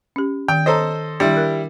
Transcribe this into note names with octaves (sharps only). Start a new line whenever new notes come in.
C#4 G4
D#3 G5
A4 C5 C#5 D#5 A#5
D#3 G3 D4 E4
A#4 F#6